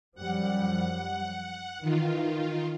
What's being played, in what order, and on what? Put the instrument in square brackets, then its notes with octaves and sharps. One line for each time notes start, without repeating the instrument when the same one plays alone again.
[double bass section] F#2 F3 G3 [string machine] F#5
[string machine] D#3 F4 [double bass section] E3